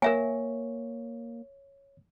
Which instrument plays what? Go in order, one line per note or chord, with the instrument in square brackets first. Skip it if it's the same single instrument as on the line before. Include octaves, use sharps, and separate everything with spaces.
[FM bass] A#3 [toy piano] A#4 E5 G#5 [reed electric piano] C#5